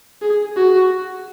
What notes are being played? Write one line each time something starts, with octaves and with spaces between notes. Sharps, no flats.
G#4
F#4